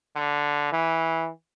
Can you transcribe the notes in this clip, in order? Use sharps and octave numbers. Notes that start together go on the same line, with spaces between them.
D3
E3